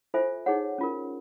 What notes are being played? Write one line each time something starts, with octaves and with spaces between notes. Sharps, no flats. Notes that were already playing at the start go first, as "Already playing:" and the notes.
F4 A4 C5 E5 G#5
D#4 G#4 C#5 F#5
C#4 F4 A#4